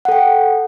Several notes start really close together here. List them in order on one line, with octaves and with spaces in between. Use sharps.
F#5 A4 G5